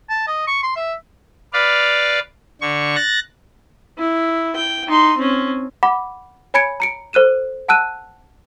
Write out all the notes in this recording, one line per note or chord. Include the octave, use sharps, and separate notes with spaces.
A5
D#5
C#6
C6
E5
B4 D5 F5
D3 C#6
F#6 A6 A#6
E4
G5
D#4 C6
C4 C#4
F#5 B5 D6
C#5 G#5 B5 G#6 C#7 D7
A#5 C#7 D7
A4 C5 F#6 D#7 E7
F#5 A5 E6 F#6 D#7